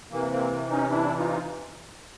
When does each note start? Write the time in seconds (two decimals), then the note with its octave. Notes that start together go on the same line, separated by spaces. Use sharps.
0.11 C3 E3 A#3
0.31 A#3 C4
0.70 C#4 D#4
0.90 D4 E4
1.16 D#4 F4